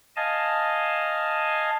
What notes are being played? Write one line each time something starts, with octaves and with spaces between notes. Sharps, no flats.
D#5 F5 G#5 A5